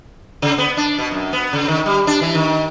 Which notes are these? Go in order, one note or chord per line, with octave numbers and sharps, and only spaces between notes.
C#3
B3
D4
B2
F#2
B3
C#3
D#3
G3
D4
E3
D#3